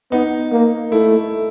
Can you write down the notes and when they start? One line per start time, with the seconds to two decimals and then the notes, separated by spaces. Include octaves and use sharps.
0.12 B3 D#4
0.52 A#3
0.91 A3 E4